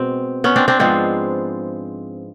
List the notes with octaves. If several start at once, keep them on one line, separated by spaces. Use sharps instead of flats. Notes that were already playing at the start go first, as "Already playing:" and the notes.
Already playing: B2 G#3 C4
B3 C#4
C4 D4
C4 D4
G#2 F3 G#3 B3 C4